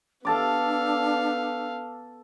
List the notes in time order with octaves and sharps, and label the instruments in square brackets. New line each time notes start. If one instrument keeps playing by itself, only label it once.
[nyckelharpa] B3 F5 [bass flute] D4 [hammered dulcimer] A4 A5 D6